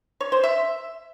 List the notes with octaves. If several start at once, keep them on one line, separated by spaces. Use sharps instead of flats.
C#5
C5
E5